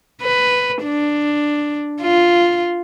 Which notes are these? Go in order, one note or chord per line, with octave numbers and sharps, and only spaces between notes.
B4
D4
F4